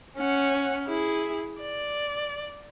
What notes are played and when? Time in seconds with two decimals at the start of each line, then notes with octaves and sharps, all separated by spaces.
0.18 C#4 F#5
0.87 E4 G#4
1.61 D5